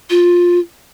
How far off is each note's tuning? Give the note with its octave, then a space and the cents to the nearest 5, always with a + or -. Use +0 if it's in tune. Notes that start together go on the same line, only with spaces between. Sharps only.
F4 +10